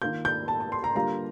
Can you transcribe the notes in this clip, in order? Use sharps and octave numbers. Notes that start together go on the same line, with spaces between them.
D#3 A#3 F4 G6
G6
A5
A5
C6
A#5
D3 G3 A#3 F4 A#5